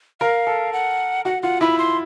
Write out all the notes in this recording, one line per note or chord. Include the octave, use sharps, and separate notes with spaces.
A#4 F5
A4
F#5
F#4 F#5
F4 F#5
E4 B5
C6